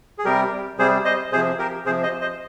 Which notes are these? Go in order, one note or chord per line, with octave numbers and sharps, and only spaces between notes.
G#4
C3 G3 G4 A#4
C3 G3 G#4 C5
C5 D#5
C3 F3 G#4 C5
G4 A#4
C3 F3 G#4 C5
C5 D#5
C5 D#5